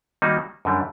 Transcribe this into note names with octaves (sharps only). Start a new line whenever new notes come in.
D#3 G3 A#3 D#4 F#4
F#2 D3 G3